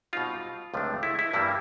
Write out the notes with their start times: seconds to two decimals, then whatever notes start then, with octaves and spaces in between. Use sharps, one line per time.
0.13 B2 G3 C4 D#4 F4
0.74 C#2 C3 F3 A3 D4
1.03 E4
1.19 E4
1.33 G2 E3 G3 A#3 E4